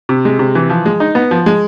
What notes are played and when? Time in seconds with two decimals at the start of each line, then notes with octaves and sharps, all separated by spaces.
0.09 C3
0.25 G#3
0.39 C3
0.55 E3
0.70 F3
0.86 G#3
1.00 D#4
1.15 B3
1.31 F3
1.46 G#3